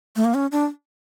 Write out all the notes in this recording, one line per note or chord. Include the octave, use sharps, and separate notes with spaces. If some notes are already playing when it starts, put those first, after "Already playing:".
A3
A#3
C#4
D4